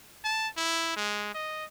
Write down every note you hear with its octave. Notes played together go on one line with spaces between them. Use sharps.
A5
E4
G#3
D#5